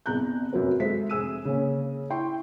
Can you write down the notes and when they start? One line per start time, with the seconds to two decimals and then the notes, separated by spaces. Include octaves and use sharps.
0.06 G1 C2 G#4 A#5 F#6 G6
0.53 F1 F#2 F#3 F#4 B4
0.80 G#3 A4 C5 E5 B6
1.10 F1 G#4 E6 D#7
1.45 C#3 A#3 C#4
2.10 E4 E5 G5 C6 C#6